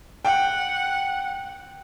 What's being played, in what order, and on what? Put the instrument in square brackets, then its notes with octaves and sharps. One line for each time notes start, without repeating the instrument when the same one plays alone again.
[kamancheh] F#5 [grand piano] G5